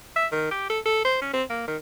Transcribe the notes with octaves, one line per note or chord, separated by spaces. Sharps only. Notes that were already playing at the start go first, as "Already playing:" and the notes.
E5
D#3
G4
A4
A4
C5
C#4
C4
A#3
D#3